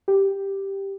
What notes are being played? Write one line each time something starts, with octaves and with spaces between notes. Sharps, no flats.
G4